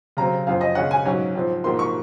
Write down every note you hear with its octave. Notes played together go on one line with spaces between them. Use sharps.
C#3 F#3 C4 A#5
F#2 F3 C4 F5
D#5
C#3 G#3 C#4 F#5
G#5
G#2 F#3 C#4
G#2 F3 C4
G#2 F3 A#3 C6
C#6